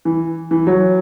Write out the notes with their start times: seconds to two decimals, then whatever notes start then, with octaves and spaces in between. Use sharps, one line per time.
0.05 E3
0.51 E3
0.67 F#3